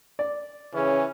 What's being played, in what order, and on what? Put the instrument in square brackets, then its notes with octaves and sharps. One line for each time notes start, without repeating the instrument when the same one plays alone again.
[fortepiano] D5
[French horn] C#3 [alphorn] E3 [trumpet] C#4